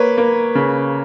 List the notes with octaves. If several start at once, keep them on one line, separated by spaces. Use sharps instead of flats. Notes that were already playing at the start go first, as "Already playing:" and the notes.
Already playing: A#3 B4 C#5
A#3
C#3